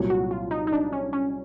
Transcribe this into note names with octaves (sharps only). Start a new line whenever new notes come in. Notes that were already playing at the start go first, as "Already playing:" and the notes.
Already playing: C2 A#2 F#3
F#4
F4
D#4
D#4
D4
C#4
C#4